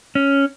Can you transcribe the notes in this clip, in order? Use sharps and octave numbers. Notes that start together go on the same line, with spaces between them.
C#4